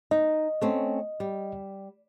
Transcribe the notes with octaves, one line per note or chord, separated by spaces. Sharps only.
D#4 D#5
A3 C4 C#4
G3